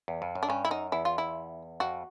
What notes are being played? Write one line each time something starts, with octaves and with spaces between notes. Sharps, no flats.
E2
F2
F#2
D4
G2 C#4
E4
F#2 D#4
E2 E4
F4
E4
F2 F#4